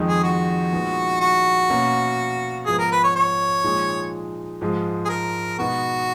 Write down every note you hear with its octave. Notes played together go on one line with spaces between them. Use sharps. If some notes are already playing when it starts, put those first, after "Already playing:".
Already playing: F2 D#3 G#3 D#4
G#4
F#4
A#2 G#3 B3 D#4
F#4
B2 A#3 C#4
G#2 F3 B3 G#4
A#4
B4
C#5
C#5
A#2 F3 G#3 D#4
G#2 F3 G#3
G#4
A#4
B2 G#3 B3 D#4 F#4